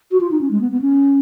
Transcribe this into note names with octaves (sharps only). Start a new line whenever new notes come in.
F#4
F4
D#4
C#4
G#3
B3
B3
C#4